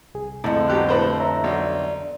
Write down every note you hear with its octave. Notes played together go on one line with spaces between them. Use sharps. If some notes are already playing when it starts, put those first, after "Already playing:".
C2 G#4
F2 A2 D3 A5
B1 G4 F#6
A2 B4 C5
C#5 E5 A#5
B1 D5